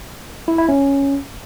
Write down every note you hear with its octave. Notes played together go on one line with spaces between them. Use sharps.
E4
E4
C#4